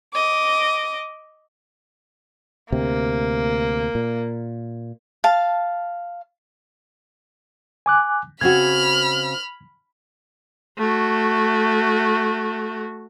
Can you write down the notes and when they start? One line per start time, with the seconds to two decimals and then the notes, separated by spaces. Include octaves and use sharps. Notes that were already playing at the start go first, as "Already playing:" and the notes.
0.12 D#5 D6
2.72 D2 C3 A#3
3.95 A#2
5.24 F5 A5
7.86 G#5 D6 F#6
8.41 C#3 C4 F#4 B5 F6 G#6
10.77 A3 F#4